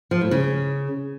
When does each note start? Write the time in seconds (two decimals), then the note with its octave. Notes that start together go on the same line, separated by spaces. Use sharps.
0.11 F3
0.21 A2
0.31 C#3